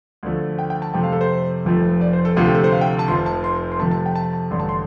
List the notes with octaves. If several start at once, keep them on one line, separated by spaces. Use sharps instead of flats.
D2 D3 F3 A3
G5
G5
A5
F2 C3 A3 G5
F5
A4
C5
F1 F2 F3 A3
D5
C5
A4
D2 C3 F3 A3 F4
G4
A4
C5
F5
G5
A5
F1 F2 F3 C6
A5
C6
C6
F2 C3 A3 A5
A5
G5
A5
A5
A1 G2 D3 A3 C6
A5
C6